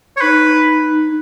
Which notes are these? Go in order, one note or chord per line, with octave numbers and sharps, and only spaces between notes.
C#5
D#4 B4